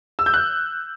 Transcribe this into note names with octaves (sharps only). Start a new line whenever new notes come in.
E6
G6
F#6